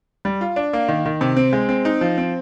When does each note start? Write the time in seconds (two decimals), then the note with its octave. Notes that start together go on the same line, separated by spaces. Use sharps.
0.25 G3
0.41 F4
0.56 D4
0.73 A#3
0.88 D#3
1.06 D#3
1.21 C3
1.37 C4
1.53 G#3
1.69 C4
1.85 D#4
2.01 F3
2.18 C4